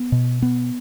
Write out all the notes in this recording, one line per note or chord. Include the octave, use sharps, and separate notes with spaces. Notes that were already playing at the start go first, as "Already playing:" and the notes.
Already playing: B3
B2
B3